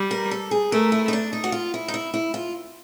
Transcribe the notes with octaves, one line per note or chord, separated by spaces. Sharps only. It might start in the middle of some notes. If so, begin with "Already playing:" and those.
Already playing: G3
A#4
A4
G#4
A3 A#4
E4
D#4
D4
D#4
F#4
F4
E4
D#4
E4
E4
F4